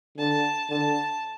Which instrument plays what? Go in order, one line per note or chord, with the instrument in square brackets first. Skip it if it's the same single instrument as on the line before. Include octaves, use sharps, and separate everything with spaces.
[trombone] D3 [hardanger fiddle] A5
[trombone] D3 [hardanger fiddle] A5